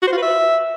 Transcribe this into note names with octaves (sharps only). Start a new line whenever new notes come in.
F#4
C5
F4
B4
E5